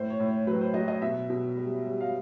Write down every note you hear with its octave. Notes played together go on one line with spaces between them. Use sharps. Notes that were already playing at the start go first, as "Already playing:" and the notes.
Already playing: A2 C5
C#5
A2
C#5
F#3 B4
C5
F#3 D#5
D#5
B2 E5
B2
G3
G3
F5